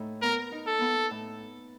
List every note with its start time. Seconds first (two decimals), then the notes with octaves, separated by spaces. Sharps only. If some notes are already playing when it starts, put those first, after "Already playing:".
Already playing: A2 D#4
0.22 B3 A#4
0.52 D#4
0.67 A4
0.81 B3
1.11 A2